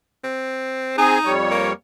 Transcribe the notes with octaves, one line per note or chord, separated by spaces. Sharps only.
C4
C4 D#4 G#4 G#5
F2 G3 C#5
A#3